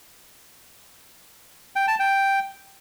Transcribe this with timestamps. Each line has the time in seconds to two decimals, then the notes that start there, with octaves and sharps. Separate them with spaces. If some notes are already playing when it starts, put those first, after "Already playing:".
1.76 G5
1.88 A5
1.99 G5